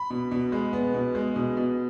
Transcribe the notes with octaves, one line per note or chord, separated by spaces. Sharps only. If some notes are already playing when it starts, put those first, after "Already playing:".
Already playing: B5
B2
B2
G#3
B3
B2
G#3
B2
B2